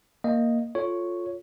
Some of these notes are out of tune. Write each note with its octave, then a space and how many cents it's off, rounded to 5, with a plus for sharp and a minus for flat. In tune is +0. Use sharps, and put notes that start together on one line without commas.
A#3 +0 D#5 +0
F4 +10 A4 +0 C#5 +0